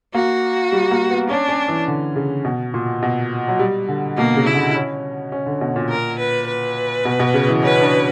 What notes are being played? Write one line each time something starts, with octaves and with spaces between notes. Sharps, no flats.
A#3 F#4
G3
A#3
B3
C#4 D4
C#4
E3
D3
C#3
B2
A#2
B2
F#3
G3
D3
B2 A#3
C#3
E4
D3
C#4
C#4
D3
B2
A#2
A#4
B4
B4
B2
B2
C#3
E3
C#4 B4
D4